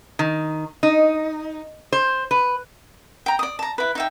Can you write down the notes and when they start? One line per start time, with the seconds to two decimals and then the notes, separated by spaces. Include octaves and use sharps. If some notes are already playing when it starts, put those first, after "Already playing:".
0.19 D#3
0.83 D#4
1.92 C5
2.31 B4
3.26 G5 A#5
3.39 D5 D#6
3.59 A5 A#5
3.78 E4 B4
3.95 D#4 E5 G5